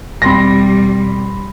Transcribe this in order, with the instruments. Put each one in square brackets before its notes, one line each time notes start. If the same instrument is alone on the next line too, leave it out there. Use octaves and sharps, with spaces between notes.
[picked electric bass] E1 C4 [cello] G3 [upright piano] B5 C6 A#6